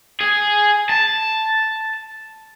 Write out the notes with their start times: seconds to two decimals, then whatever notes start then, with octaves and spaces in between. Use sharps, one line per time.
0.21 G#4
0.89 A5